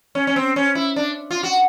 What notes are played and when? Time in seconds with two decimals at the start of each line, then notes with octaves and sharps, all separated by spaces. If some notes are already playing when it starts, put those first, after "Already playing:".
0.15 C#4
0.27 C#4
0.36 C4
0.56 C#4
0.75 E4
0.96 D4
1.31 F4
1.43 F#4